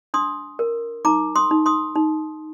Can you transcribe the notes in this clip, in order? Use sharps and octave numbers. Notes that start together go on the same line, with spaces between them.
D4 C6 D#6
A#4
D#4 A#5 D6
C6 D#6
D#4
C6 D#6
D#4